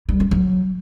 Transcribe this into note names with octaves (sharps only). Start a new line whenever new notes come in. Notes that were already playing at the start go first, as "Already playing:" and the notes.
G3
C#4
F#3